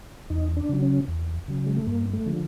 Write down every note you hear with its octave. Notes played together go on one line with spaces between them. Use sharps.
E2 D#4
D4
C#3 F#3
C#4
E2
C#3 F#3
G#3
A3
G2 A#3
A3
D3 F3 G#3